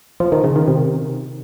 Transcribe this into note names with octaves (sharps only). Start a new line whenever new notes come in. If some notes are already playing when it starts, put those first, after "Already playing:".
F3
D#3
C#3
D#3
C3